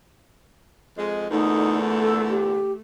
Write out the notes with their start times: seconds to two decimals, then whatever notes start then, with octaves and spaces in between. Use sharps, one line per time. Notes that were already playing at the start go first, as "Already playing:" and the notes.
0.98 F2 G#3
1.30 E2 A#2 D3 A3 D#4
2.00 A4
2.29 G4